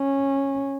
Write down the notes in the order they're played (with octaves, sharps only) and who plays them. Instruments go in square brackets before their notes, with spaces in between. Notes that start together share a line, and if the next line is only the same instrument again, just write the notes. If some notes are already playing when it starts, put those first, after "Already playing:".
Already playing: [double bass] C#4